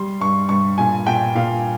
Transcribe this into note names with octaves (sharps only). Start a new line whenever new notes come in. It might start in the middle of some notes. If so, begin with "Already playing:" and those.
Already playing: G3 C6
G2 C#6
G2 C#6
A#2 G#5
A#2 G5
A#2 F5